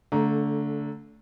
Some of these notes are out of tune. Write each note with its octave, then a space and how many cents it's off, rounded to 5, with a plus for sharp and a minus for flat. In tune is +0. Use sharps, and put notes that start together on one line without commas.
D3 -25 A3 +0 A#5 +0